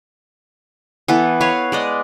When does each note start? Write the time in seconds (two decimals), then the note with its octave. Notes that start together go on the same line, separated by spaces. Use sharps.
1.08 E3 B3 A4
1.41 B4 C#5 F5
1.72 G#3 D5 D#5